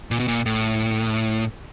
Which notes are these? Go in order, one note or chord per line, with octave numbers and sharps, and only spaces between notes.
A#2
B2
A#2
A2